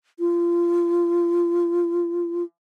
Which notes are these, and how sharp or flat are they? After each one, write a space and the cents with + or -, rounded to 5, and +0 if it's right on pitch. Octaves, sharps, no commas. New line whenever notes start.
F4 -25